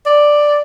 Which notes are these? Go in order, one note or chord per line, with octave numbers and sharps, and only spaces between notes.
D5